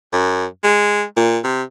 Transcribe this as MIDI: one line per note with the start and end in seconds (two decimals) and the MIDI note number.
0.13 0.45 42
0.64 1.03 56
1.16 1.38 46
1.44 1.62 48